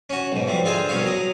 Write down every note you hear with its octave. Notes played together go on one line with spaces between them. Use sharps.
C#4 F#4
B1 G#2
E3 F3 G3
D3 C4 F4 G#4 C5
C2 B2 C#4 C#5 F5
F#3 A#5 D#6